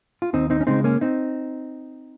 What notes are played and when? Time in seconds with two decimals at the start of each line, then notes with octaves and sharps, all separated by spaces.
0.22 F4
0.33 D#2 C4 D#4
0.50 C4 D#4
0.61 C#4
0.67 C#3 G#3 C4 D#4
0.84 A#3 C#4
1.01 C4 D#4